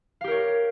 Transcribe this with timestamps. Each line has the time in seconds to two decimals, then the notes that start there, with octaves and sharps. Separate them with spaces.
0.21 F5
0.24 G4
0.28 A#4
0.31 C#5